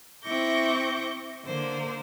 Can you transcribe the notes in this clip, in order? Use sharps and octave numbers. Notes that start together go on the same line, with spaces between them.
C4 E4 C#6 D6 G6 A#6
D3 A#3 C5